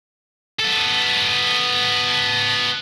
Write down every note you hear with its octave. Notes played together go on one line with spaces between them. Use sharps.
B3 A4